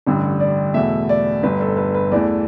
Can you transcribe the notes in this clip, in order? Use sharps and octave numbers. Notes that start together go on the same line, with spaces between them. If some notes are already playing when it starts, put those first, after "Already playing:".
A1 G2 D3
D5
E2 B2 A3 E5
D5
G1 G2 G3 B4
A4
B4
B4
E2 E3 A3 D5